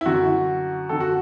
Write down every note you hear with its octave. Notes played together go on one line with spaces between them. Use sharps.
E4
F#2 D3 F#4
F#2 D3 A4
F#4